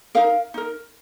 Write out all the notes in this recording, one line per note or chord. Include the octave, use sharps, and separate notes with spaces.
D#4 A#4 F5
D#4 A#4